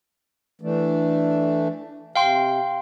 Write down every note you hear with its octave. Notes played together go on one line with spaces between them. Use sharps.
E3 A3 D4
C3 F5 G5 C6